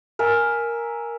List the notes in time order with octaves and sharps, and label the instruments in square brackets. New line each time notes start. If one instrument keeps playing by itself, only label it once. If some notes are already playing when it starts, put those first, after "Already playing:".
[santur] A#4 E5 G#5